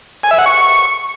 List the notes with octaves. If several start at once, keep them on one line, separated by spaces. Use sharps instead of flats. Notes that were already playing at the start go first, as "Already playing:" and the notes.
G#5
E5
F#5
C#6